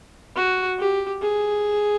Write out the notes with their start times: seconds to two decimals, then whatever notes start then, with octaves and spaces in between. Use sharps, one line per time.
0.36 F#4
0.79 G4
1.21 G#4